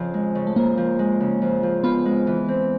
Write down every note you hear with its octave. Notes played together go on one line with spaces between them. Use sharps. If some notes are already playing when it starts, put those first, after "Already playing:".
Already playing: F2 C#3 F3
G#3
C#3
A3
F2 A#3
F3
G#3
C#3
F2
F3
B3 F4
G#3
E3
C4